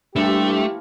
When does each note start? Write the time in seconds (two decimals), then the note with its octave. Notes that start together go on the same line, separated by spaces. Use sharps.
0.16 G2 E3 F3 A3 A#3 G4